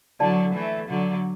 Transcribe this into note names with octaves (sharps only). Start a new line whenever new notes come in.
D3 F#3 E4 D5 F#5 A5
E3 A3
D3 F#3